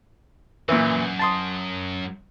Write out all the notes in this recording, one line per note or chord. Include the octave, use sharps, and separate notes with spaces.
F#2 A#2 E3
A5 C6 D#6